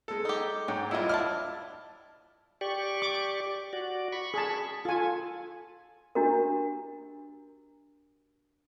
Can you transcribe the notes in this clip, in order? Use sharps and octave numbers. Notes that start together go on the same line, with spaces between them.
G#3 A4
D#4 G4
G#2 F#3 G5
G3 G#3 E4 F4 D#5
D4 E4 A5 F6
G4 D5 C#6
D6
F#4 D5
B5 C#6
G#4 A5
F4 A4 G#5
D4 E4 F#4 G4 A#4